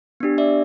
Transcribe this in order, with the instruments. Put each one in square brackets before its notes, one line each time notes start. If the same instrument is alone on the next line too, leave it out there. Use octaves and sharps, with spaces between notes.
[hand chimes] B3 D4 G4
D5 E5